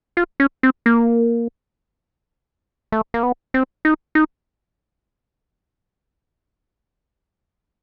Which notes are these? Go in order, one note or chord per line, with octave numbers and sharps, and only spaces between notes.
F4
C#4
C4
A#3
A3
A#3
B3
C4
D#4
D#4